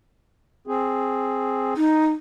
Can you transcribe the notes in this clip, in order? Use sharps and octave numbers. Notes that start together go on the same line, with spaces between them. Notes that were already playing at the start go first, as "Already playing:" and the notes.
C4 G#4
D#4